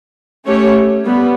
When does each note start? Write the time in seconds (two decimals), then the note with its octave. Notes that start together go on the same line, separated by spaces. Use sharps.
0.46 A3 C#4 G4 C#5
1.05 G3 B3